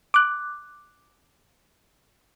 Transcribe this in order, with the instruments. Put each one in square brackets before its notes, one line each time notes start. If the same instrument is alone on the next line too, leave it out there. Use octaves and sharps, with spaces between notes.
[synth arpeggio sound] D6 F#6